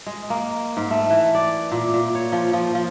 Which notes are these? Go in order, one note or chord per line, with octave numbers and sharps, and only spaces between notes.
G#3
A#3
G#2
A3
E3
D5
A#2
A#2
C#5
F3
F3
F3